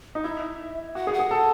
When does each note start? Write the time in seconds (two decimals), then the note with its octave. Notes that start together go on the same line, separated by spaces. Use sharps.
0.15 D#4
0.24 E4 E5
0.95 F#4 F#5
1.07 G#4
1.13 F#5
1.19 G#4
1.31 A4